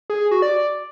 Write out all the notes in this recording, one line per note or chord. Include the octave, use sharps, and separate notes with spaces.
G#4
G#4
F#4
D5